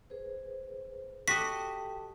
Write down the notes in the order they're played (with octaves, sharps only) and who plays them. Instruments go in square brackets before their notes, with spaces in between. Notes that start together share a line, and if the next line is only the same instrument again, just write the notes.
[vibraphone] G#4 B4 C5
[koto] F#4 D#5 [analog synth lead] G4 [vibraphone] A4 A5 [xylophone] B6